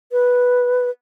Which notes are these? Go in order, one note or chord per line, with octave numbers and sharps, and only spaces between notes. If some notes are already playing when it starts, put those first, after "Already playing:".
B4